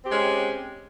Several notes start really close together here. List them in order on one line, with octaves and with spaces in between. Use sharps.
C4 G4 G#3 C#4